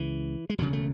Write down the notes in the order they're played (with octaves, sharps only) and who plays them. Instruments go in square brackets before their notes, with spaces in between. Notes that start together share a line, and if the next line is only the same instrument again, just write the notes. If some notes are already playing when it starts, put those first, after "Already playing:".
Already playing: [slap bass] C#2 C#3 E3
G#3
E1 D2 C#3 F#3
A3